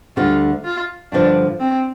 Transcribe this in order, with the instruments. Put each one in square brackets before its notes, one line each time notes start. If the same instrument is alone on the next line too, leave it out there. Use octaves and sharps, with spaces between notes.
[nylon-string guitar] D2 D3 G3 [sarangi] F4
[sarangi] F4
[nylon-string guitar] G2 D3 F3 [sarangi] D4
[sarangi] C4